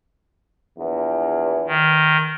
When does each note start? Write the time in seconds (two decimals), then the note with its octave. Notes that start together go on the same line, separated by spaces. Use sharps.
0.77 A#1 E2
1.67 D#3